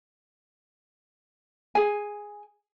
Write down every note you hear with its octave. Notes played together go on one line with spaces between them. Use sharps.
G#4 G#5